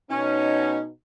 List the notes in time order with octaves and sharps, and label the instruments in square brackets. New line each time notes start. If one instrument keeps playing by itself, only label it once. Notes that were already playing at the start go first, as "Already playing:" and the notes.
[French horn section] B2 D#4 [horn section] C#4